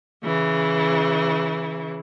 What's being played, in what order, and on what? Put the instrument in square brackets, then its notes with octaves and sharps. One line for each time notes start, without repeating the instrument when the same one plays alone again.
[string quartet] C#3 E3